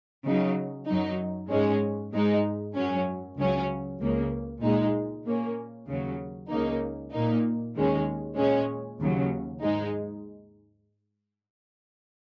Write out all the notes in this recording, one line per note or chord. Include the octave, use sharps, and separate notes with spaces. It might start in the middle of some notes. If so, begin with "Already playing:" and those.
C#3 F#3 D#4
F#2 F#3 D#4
G#2 G#3 C#4
G#2 G#3 D#4
F#2 F#3 C#4
C#2 C#3 F#3 C#4
C#2 C#3 A#3
A#2 G#3 D#4
A#2 A#3 C#4
D#2 C#3 F#3
C#2 C#3 A#3 D#4
A#2 A#3 D#4
D#2 D#3 G#3 C#4
A#2 G#3 C#4
D#2 C#3 F#3
G#2 G#3 D#4